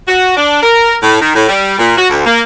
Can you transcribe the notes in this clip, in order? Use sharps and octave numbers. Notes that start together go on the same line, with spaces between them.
F#4
D4
A#4
A2
D#3
A2
G3
A#2
F#4
D2
A#3